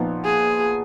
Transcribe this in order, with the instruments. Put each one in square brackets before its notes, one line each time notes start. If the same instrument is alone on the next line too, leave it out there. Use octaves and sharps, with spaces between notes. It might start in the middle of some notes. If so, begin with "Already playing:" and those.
Already playing: [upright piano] A#2 F3 B3 D#4
[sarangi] G#4